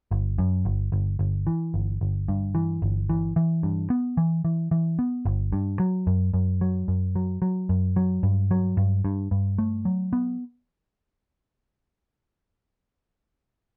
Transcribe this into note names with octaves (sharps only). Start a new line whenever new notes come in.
G1
F#2
G1
G1
G1
E3
G1
G1
G2
E3
G1
E3
E3
G2
B3
E3
E3
E3
B3
G1
G2
F#3
F#2
F#2
F#3
F#2
F#3
F#3
F#2
F#3
G2
F#3
G2
G2
G2
A3
F#3
B3